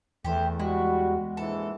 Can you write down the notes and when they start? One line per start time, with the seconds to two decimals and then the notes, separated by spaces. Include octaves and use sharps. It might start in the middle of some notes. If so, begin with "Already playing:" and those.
0.25 E2 A3 G4 C5
0.59 G3 G#3 E4 F#4
1.37 A#1 G#2 E3 A4